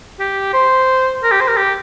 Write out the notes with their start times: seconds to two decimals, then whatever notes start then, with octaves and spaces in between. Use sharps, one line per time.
0.20 G4
0.53 C5
1.23 A#4
1.31 G4
1.41 C5
1.48 A#4
1.57 G4